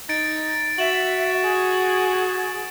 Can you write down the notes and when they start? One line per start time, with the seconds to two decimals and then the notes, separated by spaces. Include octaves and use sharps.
0.09 D#4 A6 D7
0.78 F#4 E5 A6 E7 F#7
1.42 G#4